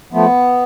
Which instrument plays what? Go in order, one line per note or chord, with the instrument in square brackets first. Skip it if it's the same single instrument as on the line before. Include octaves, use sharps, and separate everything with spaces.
[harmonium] F3 A3 B3